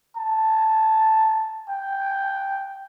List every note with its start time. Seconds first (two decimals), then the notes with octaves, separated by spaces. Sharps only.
0.16 A5
1.69 G5